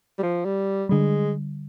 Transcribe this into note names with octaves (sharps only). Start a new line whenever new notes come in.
G3
F3
G3
D3 G3 G#3